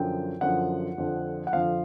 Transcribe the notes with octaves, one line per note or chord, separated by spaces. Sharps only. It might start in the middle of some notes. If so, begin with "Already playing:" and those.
Already playing: F#2 D3 F3 G5
F#2 D3 F3 F#5
F2 D3 F3
F#5
F2 D3 F3 F5